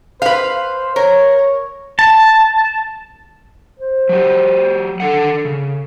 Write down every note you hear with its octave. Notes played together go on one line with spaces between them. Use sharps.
B4 C5 F5
A#4 C#5
A5
C5
F#3 G4
D3 D#3 A4 F#5
C#3